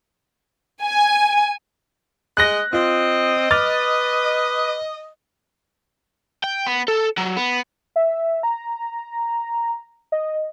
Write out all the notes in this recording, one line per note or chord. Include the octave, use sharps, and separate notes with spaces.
G#5
G#3 D#5 F#6 A#6
C4 F4 D#5
B4 D6 F6 A6
G5
B3
A4
F#3
B3
E5
A#5
D#5